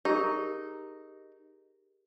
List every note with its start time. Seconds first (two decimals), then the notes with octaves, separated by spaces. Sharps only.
0.05 D#4 G4 G#4 A#4